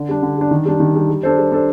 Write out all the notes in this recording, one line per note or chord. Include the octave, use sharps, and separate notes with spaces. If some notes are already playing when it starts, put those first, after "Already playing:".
Already playing: D3
G3 D4
D3
G3 D4
D#3
G3 D4
D#3
G3 D4
G3
D4 A4 C5
G3
D4 A4 C5